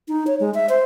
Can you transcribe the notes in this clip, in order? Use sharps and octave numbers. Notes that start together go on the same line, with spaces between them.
D#4
C#5
G#3
E5
C5